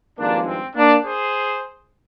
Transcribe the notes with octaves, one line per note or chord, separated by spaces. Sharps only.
G#1 G2 F3 G#3 A#3 D4
C4
A#3 D4
G#4 C5